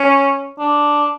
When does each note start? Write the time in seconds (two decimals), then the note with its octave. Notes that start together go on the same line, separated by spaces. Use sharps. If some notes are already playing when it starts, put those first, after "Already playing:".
Already playing: C#4
0.59 D4